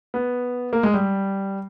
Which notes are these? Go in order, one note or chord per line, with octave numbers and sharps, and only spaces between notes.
B3
A#3
G#3
G3